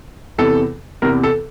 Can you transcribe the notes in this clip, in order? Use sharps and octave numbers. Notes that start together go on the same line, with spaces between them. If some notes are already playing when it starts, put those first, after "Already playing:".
E2 C3 E3 A4
E2 C3 E3 A#4
A4